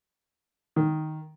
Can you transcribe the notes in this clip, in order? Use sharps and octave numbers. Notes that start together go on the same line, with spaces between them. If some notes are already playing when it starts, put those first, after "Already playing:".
D#3